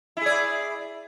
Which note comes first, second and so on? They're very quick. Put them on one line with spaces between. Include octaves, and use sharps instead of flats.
E4 G#4 D5